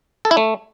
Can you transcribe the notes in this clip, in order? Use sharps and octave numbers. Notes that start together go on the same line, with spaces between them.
A4
E4
A3